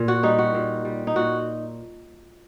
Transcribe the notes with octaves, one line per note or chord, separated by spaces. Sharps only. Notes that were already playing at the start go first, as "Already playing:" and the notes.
Already playing: A#2
F#4
G3 D#4
F#4
A#2
G3
D#4
A#2 F#4